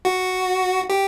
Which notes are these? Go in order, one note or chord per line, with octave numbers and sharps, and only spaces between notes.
F#4
G4